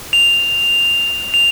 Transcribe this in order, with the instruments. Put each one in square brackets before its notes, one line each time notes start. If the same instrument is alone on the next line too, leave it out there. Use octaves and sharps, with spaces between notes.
[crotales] F7
F7